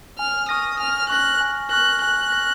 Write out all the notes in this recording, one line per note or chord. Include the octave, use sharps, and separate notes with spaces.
G#5 F6
C#6 D#6 F6 A#6
G#5 F6
C#6 F6 F#6 A#6
G#5
C#6 F6 F#6 A#6
G#5 F#6
C#6 F6 A#6